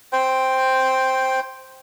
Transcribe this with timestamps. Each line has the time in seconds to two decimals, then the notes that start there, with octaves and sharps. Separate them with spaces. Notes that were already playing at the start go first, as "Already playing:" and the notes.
0.13 C5 G5